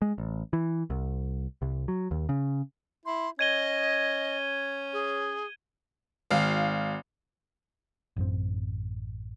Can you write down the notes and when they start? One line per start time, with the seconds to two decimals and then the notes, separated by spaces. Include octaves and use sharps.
0.02 G#3
0.18 A1
0.53 E3
0.90 C2
1.62 C2
1.88 F#3
2.11 D#2
2.29 C#3
3.06 E4 C6
3.39 C#4 D#5 G#6 D#7 G7
4.93 G#4
6.31 G#1 F5
8.16 A1 F#2 C4